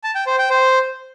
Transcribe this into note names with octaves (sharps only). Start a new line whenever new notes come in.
A5
G5
C5
G5
C5